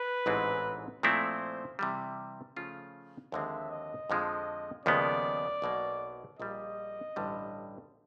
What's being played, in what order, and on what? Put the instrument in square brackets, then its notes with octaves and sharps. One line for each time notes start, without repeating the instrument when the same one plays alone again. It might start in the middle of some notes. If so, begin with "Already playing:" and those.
Already playing: [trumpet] B4
[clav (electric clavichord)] A1 G#2 E3 G#3 C4
[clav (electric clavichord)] A#2 F3 A3 C4 E4 [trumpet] C5
[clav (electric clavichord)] C3 E3 G3
C#3 F3 A3 C#4 F4
[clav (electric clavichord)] D#2 D3 F3 G#3 C4 [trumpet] E5
[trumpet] D#5
[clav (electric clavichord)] F2 D3 F3 G#3
[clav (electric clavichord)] D#2 C#3 F3 G#3 B3 [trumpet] D5
[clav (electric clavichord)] B1 B2 F#3 A#3
[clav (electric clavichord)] A#1 A#2 G3 [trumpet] D#5
[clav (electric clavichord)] A1 G2 D3 G3